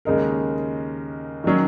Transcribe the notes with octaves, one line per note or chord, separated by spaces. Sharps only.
D#2 C#3 G#3 D#4 A#4
D#3 F#3 C#4